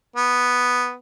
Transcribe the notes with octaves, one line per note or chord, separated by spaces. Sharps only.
B3